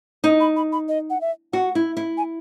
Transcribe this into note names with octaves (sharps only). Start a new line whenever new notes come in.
D#4 D#6
B5
B5
B5
D#5
F#5
E5
F#4 F#5
E4
E4
G#5